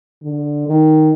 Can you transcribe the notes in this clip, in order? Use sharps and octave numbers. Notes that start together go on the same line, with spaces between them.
D3
D#3